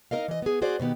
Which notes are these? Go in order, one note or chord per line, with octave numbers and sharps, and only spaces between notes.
D#4 E4 A#4 D#5 F5
E3 D#5
B3 G#4
F#4 G#4 C5 D5
B2 D#3 B3 G4